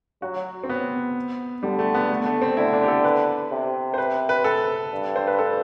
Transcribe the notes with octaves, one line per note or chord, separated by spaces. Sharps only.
F#3 F#4
C4
B3
D3 G3
A3
B3
A3
A3
C4
D3 E4
D4
G4
A4
B4
C3
C5
B4
B4
A4
G2
C5
B4
A4